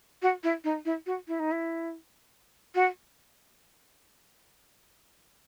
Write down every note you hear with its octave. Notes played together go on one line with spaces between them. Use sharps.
F#4
E4
D#4
E4
F#4
E4
D#4
E4
F#4